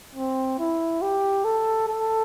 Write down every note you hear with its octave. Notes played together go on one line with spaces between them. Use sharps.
C4
E4
G4
A4
A4